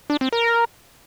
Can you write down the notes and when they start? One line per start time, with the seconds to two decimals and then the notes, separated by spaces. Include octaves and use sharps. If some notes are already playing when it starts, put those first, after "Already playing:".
0.10 D4
0.21 C4
0.33 A#4